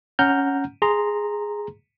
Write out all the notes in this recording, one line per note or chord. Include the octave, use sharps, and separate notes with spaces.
C#4 F#5 A#5 F6 G6
G#4 A#5 C6